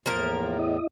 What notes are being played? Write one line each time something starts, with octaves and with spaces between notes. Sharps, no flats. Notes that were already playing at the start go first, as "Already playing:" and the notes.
E2 A2 F3 A#3 A#4
E4 D#5